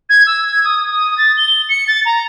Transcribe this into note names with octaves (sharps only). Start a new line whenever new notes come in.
G#6
E6
G#6
D#6
D#6
A6
G7
C#7
A6
A#5